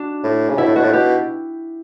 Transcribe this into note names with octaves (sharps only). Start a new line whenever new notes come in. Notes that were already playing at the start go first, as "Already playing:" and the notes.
Already playing: D4 F#4
A2
C#3
B2 E4
A2
B2 F#4
A2
B2 G4